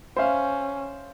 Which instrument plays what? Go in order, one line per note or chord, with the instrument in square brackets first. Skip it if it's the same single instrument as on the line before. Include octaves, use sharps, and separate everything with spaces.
[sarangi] C#4 [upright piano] C5 E5 F5